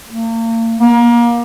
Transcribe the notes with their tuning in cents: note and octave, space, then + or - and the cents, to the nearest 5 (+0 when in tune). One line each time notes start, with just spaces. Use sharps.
A#3 -40
A#3 +30